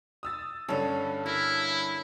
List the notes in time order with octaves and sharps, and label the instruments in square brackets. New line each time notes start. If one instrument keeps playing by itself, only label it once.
[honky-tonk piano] D#6 E6 A6
[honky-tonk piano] G2 C#4 C#5 [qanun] D3 A4
[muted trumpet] E4 [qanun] A#4